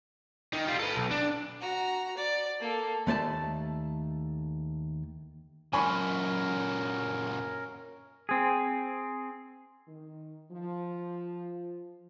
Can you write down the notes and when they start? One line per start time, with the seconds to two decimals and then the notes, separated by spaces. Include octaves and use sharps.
0.53 D#3 D#4
0.67 G3 F4
0.80 A4 B4
0.96 B1
1.11 D4
1.60 F#4 A#5
2.17 D5
2.60 A#3 A4
3.07 D#2 A3 D5 A5
5.73 F#2 A#2 C#4 A#4 G#5 B5 C#6
8.29 C4 G#4
9.88 D#3
10.51 F3